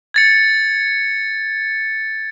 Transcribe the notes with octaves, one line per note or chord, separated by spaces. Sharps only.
G#6 A6 C#7